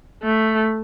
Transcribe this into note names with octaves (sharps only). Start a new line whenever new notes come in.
A3